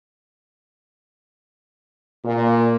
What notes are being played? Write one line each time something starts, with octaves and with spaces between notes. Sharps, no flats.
A#2